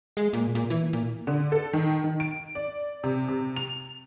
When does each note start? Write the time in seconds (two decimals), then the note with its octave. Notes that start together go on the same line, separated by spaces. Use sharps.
0.17 G#3
0.33 A#2
0.55 A#2
0.70 E3
0.93 A#2
1.27 D3
1.52 A4
1.73 D#3
2.04 D#3
2.20 D7
2.55 D5
3.04 C3
3.28 C3
3.56 F7